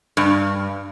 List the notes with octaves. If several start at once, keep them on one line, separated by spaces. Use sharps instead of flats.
G2